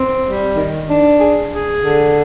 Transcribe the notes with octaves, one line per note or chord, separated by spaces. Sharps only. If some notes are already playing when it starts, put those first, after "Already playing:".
Already playing: C4
G3
D#3
D4
G#4
G#4
D3